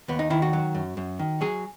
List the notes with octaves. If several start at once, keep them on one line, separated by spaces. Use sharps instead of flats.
D#2 B3
D#4
D#3 E4
F#4
F#3
F#2
F#2
D#3
F#3 G#4